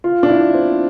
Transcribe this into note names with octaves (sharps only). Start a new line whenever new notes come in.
F4
D4
E4
C4